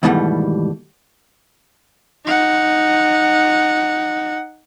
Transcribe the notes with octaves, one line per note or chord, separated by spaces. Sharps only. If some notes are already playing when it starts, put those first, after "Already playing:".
D#2 G#2 B2 E3 G3 A3
D#4 F#5